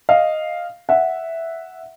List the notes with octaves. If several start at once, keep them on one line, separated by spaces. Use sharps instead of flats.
D#5 F5
E5 F#5